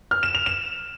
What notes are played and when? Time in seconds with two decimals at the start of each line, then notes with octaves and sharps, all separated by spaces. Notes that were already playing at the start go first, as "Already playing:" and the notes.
0.11 F6
0.23 E7
0.35 F7
0.46 E7